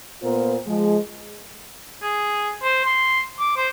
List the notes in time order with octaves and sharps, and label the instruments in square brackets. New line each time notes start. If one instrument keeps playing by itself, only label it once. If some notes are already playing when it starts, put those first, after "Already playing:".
[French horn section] A#2 B3 F4 A#4 C5
F3 G#3
[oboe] G#4
C5
C6
D6
C5